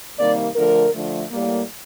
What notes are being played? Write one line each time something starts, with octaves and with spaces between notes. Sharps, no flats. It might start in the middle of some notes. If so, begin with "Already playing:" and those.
C3 D#3 G3 A#3 D5
D3 F3 A3 A#4
D3 F3 A3
A2 G3 A#3